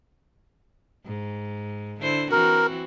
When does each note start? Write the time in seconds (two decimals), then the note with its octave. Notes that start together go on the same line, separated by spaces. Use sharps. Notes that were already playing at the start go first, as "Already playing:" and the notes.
1.06 G#2
2.01 D3 E4 C5
2.31 E3 C4 F#4 A#4